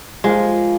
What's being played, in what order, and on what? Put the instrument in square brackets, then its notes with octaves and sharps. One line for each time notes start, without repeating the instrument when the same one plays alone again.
[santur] F3 A#3 F4 [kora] G#3